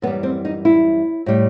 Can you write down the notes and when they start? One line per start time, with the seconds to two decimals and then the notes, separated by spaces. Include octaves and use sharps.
0.02 F#2 E3 G3 B3
0.23 C4
0.45 D#4
0.65 E4
1.26 A2 G3